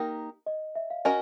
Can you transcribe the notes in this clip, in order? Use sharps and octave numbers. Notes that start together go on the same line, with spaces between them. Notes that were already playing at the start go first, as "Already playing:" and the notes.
Already playing: A#3 D#4 G4 A#4
D#5
E5
F5
C#4 F#4 A#4 D#5 G#5